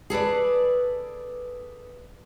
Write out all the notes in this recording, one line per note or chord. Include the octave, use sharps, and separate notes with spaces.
G#4 A4 B4 D5